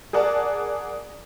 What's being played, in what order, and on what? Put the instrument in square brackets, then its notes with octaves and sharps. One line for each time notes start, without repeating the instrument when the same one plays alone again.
[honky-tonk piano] G#4 A#4 D5 F#5 A5